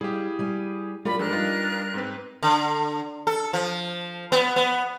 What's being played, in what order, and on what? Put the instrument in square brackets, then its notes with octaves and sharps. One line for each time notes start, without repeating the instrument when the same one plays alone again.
[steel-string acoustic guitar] G3 [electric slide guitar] E4 F5 [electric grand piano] G4 G#4
[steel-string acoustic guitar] G3 G#5
[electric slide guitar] F#3 D4 [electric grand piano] G3 [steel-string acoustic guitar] F4 A#4 D5 [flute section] B5
[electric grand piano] G#2 G#3 A4 [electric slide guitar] F3 [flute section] D4 A#4 F#6 [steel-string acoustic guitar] G4
[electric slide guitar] G3 [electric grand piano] D#4 F4 B4
[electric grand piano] G#2 C4 B4
[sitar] D3
A4
F3
B3
B3